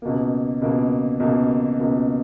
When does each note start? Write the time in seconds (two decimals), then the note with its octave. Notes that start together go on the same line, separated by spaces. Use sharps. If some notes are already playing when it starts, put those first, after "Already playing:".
0.02 C#2 B2 A#3
0.62 C#2 B2 A#3
1.20 C#2 B2 A#3
1.79 C#2 B2 A#3